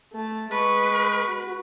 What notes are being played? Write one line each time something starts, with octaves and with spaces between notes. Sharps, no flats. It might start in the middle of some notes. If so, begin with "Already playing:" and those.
A3 A5
G#3 B4 C#6
F#4